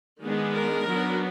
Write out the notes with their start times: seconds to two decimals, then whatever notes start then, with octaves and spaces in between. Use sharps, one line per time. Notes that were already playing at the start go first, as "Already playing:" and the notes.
0.23 D#3 G#3 B3 D4
0.55 A#4
0.86 F#3 B3 D4